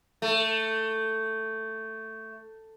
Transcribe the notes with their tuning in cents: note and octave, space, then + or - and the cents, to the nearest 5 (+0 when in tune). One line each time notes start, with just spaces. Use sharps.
A3 +10